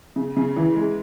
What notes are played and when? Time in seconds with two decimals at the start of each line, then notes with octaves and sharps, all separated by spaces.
0.16 C#3
0.37 C#3
0.56 E3
0.75 G#3